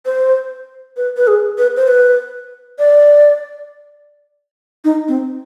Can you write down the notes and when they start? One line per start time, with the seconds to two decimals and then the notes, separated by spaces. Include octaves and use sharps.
0.06 C5
0.97 B4
1.17 B4
1.27 G#4
1.58 B4
1.77 C5
1.88 B4
2.79 D5
4.85 D#4
5.08 C4